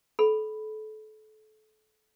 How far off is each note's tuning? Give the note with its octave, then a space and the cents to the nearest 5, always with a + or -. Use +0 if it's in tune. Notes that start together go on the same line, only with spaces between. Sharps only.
A4 -30 B5 +0